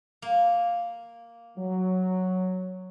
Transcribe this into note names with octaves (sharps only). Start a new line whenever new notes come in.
A#3
F#3